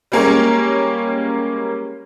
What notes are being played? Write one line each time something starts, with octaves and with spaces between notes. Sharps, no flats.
G3 G#3 A#3 C#4 A#4 C#5